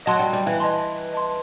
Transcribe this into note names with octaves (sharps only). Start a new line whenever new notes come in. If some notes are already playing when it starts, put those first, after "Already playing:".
F#3 D#5 A5 C6
G3
G3
E3
D#5 A5 C6
D#5 A5 C6